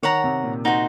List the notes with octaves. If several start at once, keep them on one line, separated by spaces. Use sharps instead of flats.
D#3 C#5 F#5 A#5
C3
A#2
D#4 F#4 C5